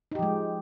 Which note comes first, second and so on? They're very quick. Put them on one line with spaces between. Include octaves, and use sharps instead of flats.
D#4 G4 F3 G#3